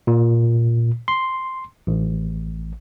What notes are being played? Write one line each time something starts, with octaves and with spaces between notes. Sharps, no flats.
A#2
C6
A1